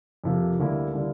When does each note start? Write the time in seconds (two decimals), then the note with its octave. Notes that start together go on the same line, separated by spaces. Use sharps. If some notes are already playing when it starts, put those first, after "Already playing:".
0.24 F2 C3 F3 A#3
0.59 D2 D3 G3 A#3 E4
0.93 D3 G3 A#3 E4